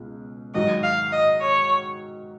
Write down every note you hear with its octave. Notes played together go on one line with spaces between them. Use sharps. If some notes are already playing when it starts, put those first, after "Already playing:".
Already playing: C#2 B2
G#2 D#3 F#3 D#5
F5
D#5
C#5